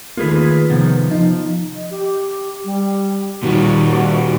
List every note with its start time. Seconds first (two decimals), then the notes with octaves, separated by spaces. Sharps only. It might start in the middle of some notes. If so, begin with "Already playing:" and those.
0.17 D#3 A3 A#3 F4 G#4 B4
0.70 C3 D#3 F3 B3
1.11 F3 D#4
1.75 D#5
1.91 G4
2.64 G3
3.43 A#2 D#3 G3 F#4